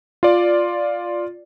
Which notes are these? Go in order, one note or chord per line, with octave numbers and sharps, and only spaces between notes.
F4 D5